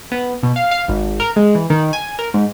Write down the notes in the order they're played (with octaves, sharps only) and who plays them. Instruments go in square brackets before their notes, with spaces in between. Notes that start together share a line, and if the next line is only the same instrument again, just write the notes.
[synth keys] B3
B2
F5
F5
G#1
A#4
G#3
E3
D#3
G#5
A#4
G#2